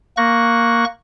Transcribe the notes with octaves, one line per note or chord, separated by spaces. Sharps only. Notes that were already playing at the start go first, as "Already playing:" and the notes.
A#3 C#6 F#6 A#6